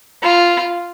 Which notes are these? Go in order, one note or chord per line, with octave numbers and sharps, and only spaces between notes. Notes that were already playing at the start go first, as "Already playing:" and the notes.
F4